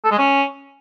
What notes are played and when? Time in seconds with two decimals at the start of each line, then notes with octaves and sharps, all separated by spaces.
0.04 A4
0.11 G#3
0.18 C#4